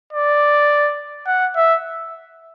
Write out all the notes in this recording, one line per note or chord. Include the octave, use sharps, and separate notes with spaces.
D5
F#5
E5